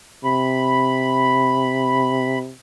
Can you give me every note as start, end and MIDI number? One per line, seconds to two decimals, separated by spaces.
0.24 2.52 48
0.24 2.39 83